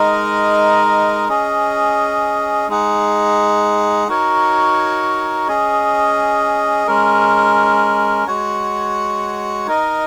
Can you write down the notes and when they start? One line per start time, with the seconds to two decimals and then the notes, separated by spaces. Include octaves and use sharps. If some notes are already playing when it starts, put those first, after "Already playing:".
Already playing: G#3 D#4 A#4 D#5
1.29 C#4 G#4 D#5
2.68 G#3 D#4 G#4 F#5
4.08 D#4 F#4 A#4 C#5
5.48 C#4 G#4 D#5
6.87 G#3 C#4 A#4
8.28 G#3 F#4 C#5 F#5
9.66 D#4 A#4 D#5